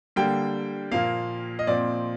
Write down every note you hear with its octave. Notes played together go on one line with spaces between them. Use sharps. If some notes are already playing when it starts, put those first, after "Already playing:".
D3 G3 A#3 G5
A#2 F3 A#3 F5
D#5
A#2 F3 C4 D5